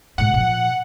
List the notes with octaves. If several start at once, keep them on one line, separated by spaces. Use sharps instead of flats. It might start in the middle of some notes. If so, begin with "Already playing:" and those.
A2 G#3 F#5
A#2 F3